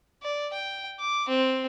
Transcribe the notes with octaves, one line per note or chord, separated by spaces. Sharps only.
D5
G5
D6
C4